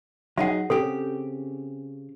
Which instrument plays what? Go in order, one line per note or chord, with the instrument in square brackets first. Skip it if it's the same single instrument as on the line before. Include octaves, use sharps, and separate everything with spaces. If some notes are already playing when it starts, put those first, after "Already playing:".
[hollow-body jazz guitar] F#3 D#4 G#4 [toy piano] F5 F#5
[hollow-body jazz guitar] C#3 C4 G4 [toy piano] A4